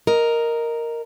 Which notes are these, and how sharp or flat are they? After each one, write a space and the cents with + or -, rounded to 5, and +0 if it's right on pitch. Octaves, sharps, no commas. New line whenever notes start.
A#4 +0 D#5 +0